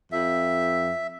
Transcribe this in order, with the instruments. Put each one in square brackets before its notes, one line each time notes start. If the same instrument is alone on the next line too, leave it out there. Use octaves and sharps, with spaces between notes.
[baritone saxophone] F2 [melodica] E5